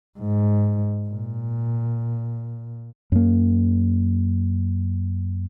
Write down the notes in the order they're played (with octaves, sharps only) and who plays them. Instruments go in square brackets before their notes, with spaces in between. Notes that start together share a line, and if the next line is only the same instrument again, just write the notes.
[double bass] G#2
A#2
[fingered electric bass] F#2 A#3